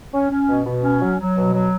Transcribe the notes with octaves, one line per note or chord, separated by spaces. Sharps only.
C#4
C#4
B2
B2
C#4
F#3
F#3
B2
F#3